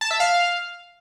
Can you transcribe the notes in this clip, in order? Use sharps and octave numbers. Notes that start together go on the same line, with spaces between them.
A5
E5
F5